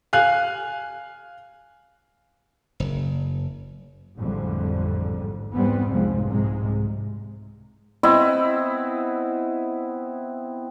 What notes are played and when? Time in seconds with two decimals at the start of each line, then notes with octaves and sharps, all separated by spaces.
0.13 F5 G#5 F#6
2.80 F#1
4.18 A1 F2 G#2 D3 G3
5.54 G#2 E3 G3 B3 C4
5.89 F1 C2 G#2 F3 G#3
6.30 C2 G#2 C3 G#3
8.03 B3 C4 E4 D#5